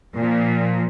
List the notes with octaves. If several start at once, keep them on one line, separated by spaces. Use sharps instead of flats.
A#2 F3